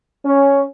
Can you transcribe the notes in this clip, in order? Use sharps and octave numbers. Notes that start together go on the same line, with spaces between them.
C#4